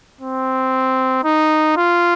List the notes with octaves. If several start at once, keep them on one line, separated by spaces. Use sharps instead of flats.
C4
D#4
F4